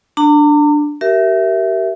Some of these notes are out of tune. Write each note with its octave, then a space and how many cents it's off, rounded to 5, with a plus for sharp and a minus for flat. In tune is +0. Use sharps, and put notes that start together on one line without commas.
D4 +0 A#5 -45
G4 -35 A#4 +0 E5 +0